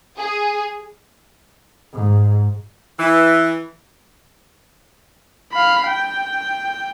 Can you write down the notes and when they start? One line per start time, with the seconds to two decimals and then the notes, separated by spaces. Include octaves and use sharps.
0.18 G#4
1.93 G#2
2.99 E3
5.52 F5 B5
5.87 G5